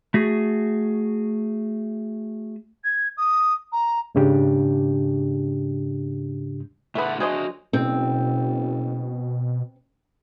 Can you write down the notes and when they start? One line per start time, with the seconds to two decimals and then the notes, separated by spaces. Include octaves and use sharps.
0.14 A3 F#4 G#4
2.84 G#6
3.17 D#6
3.72 A#5
4.15 D#2 G#2 C#3 D4 G4
6.95 A2 A3 B3 A4 F#5
7.20 F#3 D4 F#4 G#4 C5 D#5
7.73 F#1 B2 C4